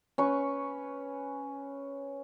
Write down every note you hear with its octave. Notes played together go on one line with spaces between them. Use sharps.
C#4 B4 C#6